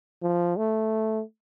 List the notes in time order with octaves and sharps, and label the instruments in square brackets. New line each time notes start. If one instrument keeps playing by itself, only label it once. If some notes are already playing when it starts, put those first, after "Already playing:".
[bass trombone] F3
A3